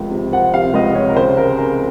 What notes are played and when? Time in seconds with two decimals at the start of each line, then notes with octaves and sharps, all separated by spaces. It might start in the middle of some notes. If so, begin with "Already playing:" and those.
Already playing: C#2 C3 F3
0.11 C3
0.32 F3 F#5
0.54 C3 F5
0.74 C#2 D#5
0.95 C3 C#5
1.09 A#4
1.16 C#3 C5
1.37 C#3 A#4
1.58 C#3 A#4